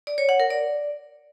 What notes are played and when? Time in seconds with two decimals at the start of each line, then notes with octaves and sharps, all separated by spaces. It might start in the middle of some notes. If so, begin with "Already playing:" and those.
0.07 D5
0.18 C#5
0.29 F#5
0.40 A#4
0.50 D5